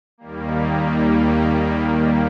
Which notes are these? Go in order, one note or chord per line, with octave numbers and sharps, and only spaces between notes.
D#2 D#3 G3 A#3